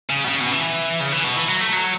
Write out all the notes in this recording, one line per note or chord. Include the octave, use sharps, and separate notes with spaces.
C#3
B2
C#3
B2
E3
C#3
E3
B2
E3
F#3
A3
F#3